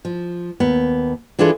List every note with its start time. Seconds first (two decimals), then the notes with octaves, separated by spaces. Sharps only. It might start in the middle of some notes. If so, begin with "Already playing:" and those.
0.05 F3
0.60 D#2 B3
1.39 E3 D4 E4 F4 G#4 A4